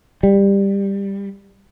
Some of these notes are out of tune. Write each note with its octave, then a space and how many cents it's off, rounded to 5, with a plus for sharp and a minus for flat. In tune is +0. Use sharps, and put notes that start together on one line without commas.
G3 +15